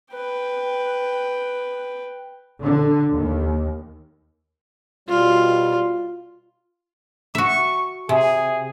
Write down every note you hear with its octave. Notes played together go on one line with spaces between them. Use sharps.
B4 G5
D3
D#2
B2 G3 F4
F#4 E5 C#6
C3 G#4